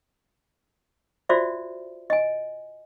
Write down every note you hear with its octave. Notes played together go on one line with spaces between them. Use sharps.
F4 F#4 C5 D5 E5
D#5 G#5